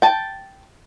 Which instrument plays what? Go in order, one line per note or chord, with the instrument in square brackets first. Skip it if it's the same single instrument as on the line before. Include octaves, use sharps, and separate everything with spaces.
[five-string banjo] G5 A5